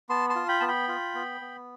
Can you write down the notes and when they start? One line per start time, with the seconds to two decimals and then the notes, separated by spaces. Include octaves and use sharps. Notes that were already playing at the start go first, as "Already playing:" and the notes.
0.09 B3 A5 C6
0.29 A5 C6
0.36 F4
0.48 G5 B5
0.60 B3 A5
0.68 G5 B5
0.88 F4
1.15 B3
1.41 B3